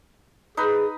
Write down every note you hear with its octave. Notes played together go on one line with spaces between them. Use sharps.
D#4 G#4 B4